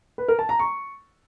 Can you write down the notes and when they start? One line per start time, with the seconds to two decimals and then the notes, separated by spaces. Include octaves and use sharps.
0.18 B4
0.28 A#4
0.39 A5
0.49 A#5
0.59 C#6